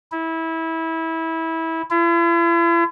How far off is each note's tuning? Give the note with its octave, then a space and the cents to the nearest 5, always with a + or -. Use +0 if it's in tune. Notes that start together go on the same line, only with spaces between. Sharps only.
E4 -20
E4 +45